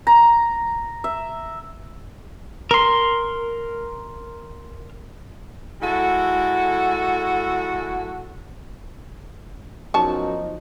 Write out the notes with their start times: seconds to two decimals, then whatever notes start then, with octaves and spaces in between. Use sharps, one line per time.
0.07 A#5
1.04 E5
2.71 A#4 C6
5.81 G#3 E4 F#4 A4
9.94 F#2 F3 B3 D#4 C#5 A5